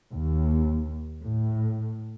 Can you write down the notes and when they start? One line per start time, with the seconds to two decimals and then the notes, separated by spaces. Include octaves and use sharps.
0.13 D#2
1.24 A2